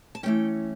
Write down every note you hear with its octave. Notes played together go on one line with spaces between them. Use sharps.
A5
E3 A3 C#4 G5